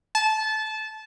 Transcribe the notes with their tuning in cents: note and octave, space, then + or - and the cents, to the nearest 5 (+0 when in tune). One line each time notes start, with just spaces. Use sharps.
A5 -20